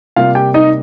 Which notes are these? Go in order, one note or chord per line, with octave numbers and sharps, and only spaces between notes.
C3 G3 A#3 F4 F5
G4 G5
D#4 D#5